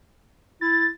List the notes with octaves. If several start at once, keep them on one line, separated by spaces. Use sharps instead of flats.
E4 A6